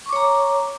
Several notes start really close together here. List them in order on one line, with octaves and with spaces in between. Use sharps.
C#6 D6 C#5 A#5